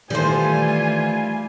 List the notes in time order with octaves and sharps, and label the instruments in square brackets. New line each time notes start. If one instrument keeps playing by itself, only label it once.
[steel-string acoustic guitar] D#3 E3 A4 [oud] G3 C5 [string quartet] A3 F4 [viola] G#5